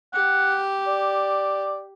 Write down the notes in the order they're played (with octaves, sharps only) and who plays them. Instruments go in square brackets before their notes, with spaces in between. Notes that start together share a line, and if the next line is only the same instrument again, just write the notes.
[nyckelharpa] G4 [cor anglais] F#5
[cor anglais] D5